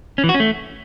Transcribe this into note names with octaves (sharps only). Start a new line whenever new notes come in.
C#4
E3
F#4
C#4
A3